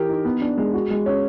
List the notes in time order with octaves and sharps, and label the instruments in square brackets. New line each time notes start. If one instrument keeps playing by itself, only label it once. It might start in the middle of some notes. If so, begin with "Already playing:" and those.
Already playing: [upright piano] E3 G4 A#4
D#4
B3
D4
G#3
F#4
G#3
C#4